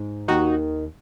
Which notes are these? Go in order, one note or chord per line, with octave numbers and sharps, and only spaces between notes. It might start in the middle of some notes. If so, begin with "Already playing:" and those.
Already playing: G#2
D#2 D#3 D#4 F#4